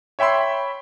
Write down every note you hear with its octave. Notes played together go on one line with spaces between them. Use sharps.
C#5 E5 G5 B5 C6